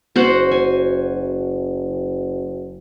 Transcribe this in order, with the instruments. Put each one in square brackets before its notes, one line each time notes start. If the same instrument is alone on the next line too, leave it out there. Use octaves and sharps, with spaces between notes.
[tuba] F#1 [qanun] F#4 C5 F#5
[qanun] G#5